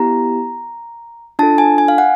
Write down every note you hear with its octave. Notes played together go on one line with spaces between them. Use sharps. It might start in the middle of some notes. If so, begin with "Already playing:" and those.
Already playing: B3 E4 G4 A#5
D4 F4 A4 A5
G#5
G#5
F5
F#5